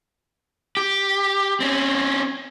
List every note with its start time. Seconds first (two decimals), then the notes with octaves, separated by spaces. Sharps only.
0.77 G4
1.60 C4 C#4